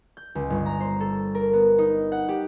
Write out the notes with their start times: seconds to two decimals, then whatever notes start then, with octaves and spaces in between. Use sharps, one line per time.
0.17 G6
0.35 C#2
0.50 G1
0.66 A#5
0.80 C5
1.00 A4
1.35 A#4
1.53 B3
1.78 D#4
2.12 F#5
2.29 G4